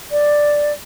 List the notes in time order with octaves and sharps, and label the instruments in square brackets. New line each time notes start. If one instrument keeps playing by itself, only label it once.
[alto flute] D5